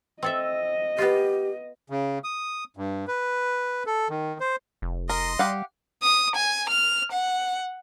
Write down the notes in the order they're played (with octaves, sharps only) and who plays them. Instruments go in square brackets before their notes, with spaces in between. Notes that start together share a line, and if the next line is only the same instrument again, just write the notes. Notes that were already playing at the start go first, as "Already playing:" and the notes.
[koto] C4 A4 E5 [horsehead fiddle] D#5
[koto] B3 F4 [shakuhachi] G4
[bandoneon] C#3
D#6
G2
B4
A4
D#3
C5
[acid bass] F1
[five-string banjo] A#4 [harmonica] D#5 C6
[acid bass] G3 [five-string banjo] G4 F5 F#5
[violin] D#6
G#5
F6
F#5